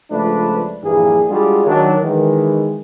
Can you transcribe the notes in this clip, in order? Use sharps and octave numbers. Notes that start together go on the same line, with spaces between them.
C#2 F3 A3 D4 B4
A#1 G2 E3 G3 A#3 G#4
G3 G#3 D4 F4 F#4 G#4
D#3 F#3 D4
D#3 E3 G#3